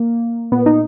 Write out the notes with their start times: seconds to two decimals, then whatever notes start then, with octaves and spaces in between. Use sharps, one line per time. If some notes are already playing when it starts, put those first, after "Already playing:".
Already playing: A#3
0.52 A#2 B3
0.66 D#4